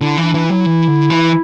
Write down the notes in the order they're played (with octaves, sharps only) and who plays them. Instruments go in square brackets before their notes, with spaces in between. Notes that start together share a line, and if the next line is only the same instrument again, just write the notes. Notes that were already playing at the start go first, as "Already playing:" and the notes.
[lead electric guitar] D3 [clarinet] E4
[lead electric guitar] E3
[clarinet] D4
[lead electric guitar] E3
[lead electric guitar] F#3 [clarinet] E4
[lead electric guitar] E3
D3
E3